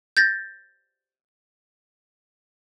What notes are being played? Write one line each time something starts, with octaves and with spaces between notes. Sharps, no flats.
G6 A6 A#6